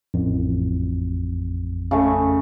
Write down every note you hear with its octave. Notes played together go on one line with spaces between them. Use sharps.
A1 F2
C#3 A3